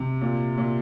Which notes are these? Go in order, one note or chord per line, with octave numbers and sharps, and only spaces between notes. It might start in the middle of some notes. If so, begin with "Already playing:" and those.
Already playing: C3
A#2
A#2